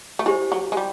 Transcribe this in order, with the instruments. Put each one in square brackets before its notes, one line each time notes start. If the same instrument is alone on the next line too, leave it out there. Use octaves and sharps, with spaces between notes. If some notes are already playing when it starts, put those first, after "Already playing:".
[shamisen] A3
[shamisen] G#3 [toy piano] E4 G4 C5
[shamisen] F#3
G#3
G3